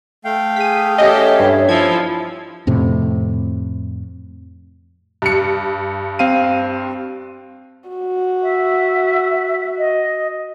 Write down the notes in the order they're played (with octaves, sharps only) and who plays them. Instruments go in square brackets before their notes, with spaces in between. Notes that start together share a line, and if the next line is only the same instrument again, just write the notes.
[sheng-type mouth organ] A3 F5 G5
[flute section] G#4 [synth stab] B6 D#7
[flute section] C#4 C#5 E5 [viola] G4 A4 [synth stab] D#5
[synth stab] G2
[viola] F3 E4 [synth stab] G#6
[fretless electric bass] F2 A2 C3
[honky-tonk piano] G2 C#7
[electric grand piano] C4 F5 D#7
[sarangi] F#4
[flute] E5
D#5